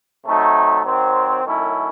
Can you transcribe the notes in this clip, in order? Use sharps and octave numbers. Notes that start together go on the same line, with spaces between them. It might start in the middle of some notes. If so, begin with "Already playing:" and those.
C3 F#3 A3 D#4
D#3 F#3 C4
F#2 D#3 A3 C#4 E4